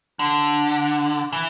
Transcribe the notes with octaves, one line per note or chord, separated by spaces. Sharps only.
D3
E3